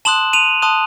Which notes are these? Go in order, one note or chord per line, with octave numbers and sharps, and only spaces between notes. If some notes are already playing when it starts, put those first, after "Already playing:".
A5 C6 D#6 F#6 E7 F#7
D#7 F7
A5 C6 D#6 F#6